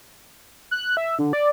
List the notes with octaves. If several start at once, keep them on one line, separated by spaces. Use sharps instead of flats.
F#6
E5
D3
D5